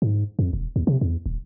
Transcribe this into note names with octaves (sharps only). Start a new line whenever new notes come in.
G#2
F2
E1
D#2
C3
E2
D#1